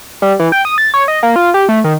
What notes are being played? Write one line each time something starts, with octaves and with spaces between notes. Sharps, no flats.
G3
E3
G5
D#6
A6
C#5
D#5
A#3
F4
G4
A3
D#3